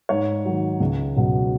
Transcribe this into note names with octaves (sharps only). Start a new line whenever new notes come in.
G#2 C#5
D#3 F#3
C#2
B2 F#3